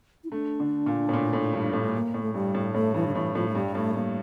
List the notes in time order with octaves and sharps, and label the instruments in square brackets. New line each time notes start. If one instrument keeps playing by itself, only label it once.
[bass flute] E4
[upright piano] A3 [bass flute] D4
[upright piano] D3
A#2
A2
A#2
A2
G2
A2
[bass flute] A3
A#3
[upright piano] A2
[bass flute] A3
[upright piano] G2 [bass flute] G3
[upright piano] A2
[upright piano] A2 [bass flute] A3
[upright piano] G2 [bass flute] E3
[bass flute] D3
[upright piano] A2 [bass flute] E3
[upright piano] A2 [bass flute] F3
[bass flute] A3
[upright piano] G2 [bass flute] G3
[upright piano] A2 [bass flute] A3
[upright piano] G2 [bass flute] A#3